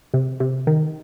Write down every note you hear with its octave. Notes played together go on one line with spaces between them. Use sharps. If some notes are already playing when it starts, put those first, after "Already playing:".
C3
C3
D#3